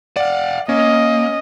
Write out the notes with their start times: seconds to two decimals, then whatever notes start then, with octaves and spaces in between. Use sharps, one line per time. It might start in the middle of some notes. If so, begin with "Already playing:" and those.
0.16 D5 F5 F#5
0.69 A#3 C#4 D#5